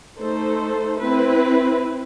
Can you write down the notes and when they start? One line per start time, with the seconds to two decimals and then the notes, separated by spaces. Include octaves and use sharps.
0.19 A3 D#4 A4 C5
1.00 C4 E4 B4